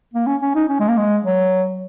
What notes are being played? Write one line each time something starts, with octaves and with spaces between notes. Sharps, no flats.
A#3
C#4
C#4
D#4
C#4
G#3
A#3
G#3
F#3